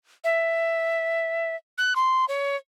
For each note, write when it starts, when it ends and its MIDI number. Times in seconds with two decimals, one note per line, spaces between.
0.24 1.55 76
1.78 1.94 90
1.96 2.25 84
2.28 2.56 73